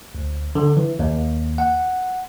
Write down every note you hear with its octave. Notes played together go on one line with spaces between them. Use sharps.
D2
D3
E3
D#2
F#5